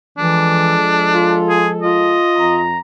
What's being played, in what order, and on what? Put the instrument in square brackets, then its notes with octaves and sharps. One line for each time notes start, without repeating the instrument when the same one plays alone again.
[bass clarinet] E3 [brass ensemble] F3 G#3 A4 [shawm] D4
[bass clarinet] F4
[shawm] G#4
[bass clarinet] F4 [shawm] D#5
[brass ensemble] F2 A#5